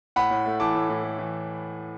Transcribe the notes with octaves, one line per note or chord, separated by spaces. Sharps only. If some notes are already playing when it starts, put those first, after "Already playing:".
A2 F#5 B5
A2
A3
E3 A5 D6
A2
A2
A3
E3